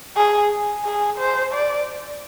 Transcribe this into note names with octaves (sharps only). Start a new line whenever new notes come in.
G#4
G#4
C5
D5